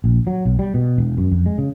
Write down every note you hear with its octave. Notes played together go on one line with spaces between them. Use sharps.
A#1
F#3
B1
G3
B2
E1
F#2
F2
G#3
C#3